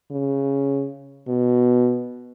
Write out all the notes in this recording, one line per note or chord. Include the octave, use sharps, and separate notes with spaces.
C#3
B2